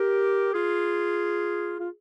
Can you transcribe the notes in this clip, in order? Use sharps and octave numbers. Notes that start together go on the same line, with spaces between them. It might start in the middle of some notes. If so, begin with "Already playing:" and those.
Already playing: G4 A#4
F4 G#4
F4